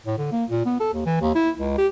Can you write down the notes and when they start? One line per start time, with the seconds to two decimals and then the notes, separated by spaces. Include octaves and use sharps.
0.06 A2
0.18 D3
0.32 A#3
0.50 A#2
0.65 B3
0.80 A4
0.94 D#2
1.06 E3
1.21 D#2
1.35 E4
1.59 C#2
1.78 G4